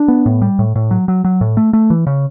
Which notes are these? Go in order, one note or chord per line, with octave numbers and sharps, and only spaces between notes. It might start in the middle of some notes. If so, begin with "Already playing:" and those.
Already playing: D4
B3
A2
G3
A2
A2
F#3
F#3
F#3
A2
A3
A3
E3
C#3